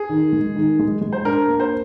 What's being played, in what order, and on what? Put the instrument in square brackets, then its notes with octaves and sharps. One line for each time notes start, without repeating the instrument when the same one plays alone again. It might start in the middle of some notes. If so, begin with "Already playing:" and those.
Already playing: [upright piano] G#4
[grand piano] D#3
G#3
D#3
G#3
G#3
[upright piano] C5
[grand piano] D4 [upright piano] A#4
[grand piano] A#3
[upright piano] C5